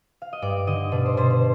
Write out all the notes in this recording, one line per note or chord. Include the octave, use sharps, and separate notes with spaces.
F5
D#5
G2 D5
D3 D#5
B2 D5
C5
B2 C5
C5